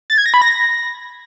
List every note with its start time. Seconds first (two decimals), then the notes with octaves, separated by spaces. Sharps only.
0.10 A6
0.18 G#6
0.26 A#6
0.34 B5
0.42 A#6